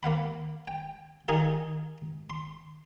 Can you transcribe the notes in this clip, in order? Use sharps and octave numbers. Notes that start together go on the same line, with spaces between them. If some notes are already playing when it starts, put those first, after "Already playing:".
A#3 F5 F#5 B5
G5
D#3 D#4 G#4 A#4 F5
C6